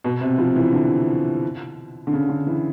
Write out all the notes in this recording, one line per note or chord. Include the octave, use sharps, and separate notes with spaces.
B2
C3
F3
E3
D3
D3
C#3
D3
E3